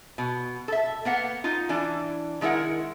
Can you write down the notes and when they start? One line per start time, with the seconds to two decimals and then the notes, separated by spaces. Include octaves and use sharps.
0.18 B2
0.68 A4 E5
1.05 A#3 B3 F#5
1.44 D#4 F4
1.69 E3 D4
2.41 D#3 G#3 E4 A#4 F#5